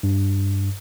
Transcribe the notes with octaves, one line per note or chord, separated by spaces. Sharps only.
G2